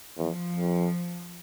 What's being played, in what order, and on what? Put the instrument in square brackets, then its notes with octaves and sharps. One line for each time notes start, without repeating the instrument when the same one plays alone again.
[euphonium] E2 [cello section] F3
[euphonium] F2